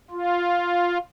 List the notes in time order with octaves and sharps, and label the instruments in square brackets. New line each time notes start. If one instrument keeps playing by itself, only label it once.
[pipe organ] F4